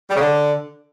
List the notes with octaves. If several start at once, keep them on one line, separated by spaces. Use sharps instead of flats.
G3
C#3
D3